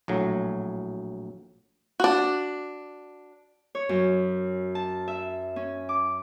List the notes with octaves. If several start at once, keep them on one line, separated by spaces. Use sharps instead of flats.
A#1 A2 F#3
D4 F#4
C#5
F#2
A5
E5
C#4
D6